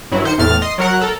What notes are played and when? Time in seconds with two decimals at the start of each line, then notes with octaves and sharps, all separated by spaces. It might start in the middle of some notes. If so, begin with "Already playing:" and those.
0.12 G2 F#3 E4
0.24 D#3 C5 C#7
0.38 E2 A2 F6 A6
0.62 D#5 C6
0.78 F#3 A#4 F#5
1.01 A4 A#4